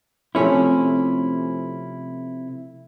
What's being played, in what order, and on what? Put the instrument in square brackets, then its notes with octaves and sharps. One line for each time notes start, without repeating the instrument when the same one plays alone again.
[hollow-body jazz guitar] C3 F3 A3 C#4 E4